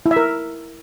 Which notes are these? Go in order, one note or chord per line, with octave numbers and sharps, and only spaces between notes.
E4
E5
A#4